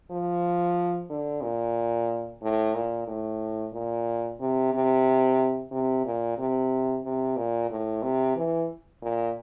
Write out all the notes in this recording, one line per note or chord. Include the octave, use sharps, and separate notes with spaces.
F3
D3
A#2
A2
A#2
A2
A#2
C3
C3
C3
A#2
C3
C3
A#2
A2
C3
E3
A#2